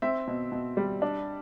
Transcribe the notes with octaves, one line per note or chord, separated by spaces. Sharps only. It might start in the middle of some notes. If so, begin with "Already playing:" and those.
C4 E5
B2
B2
G3
D4